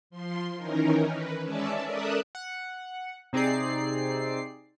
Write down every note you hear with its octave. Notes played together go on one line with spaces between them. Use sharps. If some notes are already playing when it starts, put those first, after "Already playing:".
F3 C6
D#3 E3 C#4 D#4 A#4
B4
G#3 C#4 D5 E5 A5
A4 A#4 D5 E5 D#6 F#6
F#5
C3 C4 D#4 G#4 D5 C7